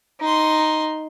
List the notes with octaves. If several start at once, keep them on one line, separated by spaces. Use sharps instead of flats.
D#4 C6